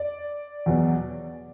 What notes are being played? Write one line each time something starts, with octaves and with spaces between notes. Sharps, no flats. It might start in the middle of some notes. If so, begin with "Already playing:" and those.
Already playing: D5
E2 B2 F#3